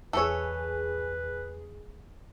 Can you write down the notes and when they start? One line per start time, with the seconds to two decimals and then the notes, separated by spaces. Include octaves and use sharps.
0.13 E2 E3 G#4 A4 B4 C#5